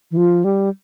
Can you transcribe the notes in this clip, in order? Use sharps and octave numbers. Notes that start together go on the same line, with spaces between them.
E3
F3
G3